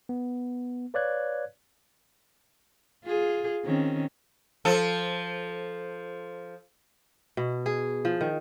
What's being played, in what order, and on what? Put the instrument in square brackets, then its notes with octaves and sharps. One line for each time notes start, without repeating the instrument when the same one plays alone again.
[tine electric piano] B3
B4 C#5 D5 F5 F#6 G#6
[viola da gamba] F4 G#4
D#3 C4 C#4
[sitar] F3 A4
[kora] B2
G#4
F3
D#3